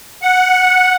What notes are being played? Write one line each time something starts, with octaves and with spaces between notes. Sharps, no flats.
F#5